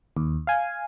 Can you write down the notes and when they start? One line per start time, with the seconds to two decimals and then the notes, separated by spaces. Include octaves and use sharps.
0.17 D#2
0.47 F5 G#5